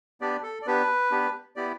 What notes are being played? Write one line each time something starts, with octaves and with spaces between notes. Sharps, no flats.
B3 D4 G4 D5
A4
D5
B3 D4 G4 B4
B3 D4 G4
B3 E4 G4 D5